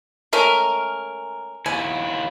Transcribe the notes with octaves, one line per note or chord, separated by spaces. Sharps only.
G#3 A3 C#4 A#4
D#2 E4 G#5